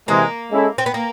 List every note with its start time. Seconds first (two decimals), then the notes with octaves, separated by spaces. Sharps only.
0.08 C3 E3 G#3 A#3
0.51 G#3 C#4 E4 A4
0.78 C4
0.86 B3
0.94 A#3